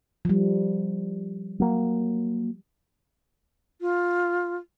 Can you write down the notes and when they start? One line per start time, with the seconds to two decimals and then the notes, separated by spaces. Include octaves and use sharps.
0.25 F3 G3
1.60 F#3 A#3
3.81 F4